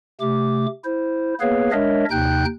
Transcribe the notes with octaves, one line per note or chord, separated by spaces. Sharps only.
C3 A3 G4 D6
E4 C5
A#3 B3 G#4 B4 C#5 F5
G#3 D4 A#4 C#5 D#5 E5
D#2 C3 D#4 G5 F#6 G6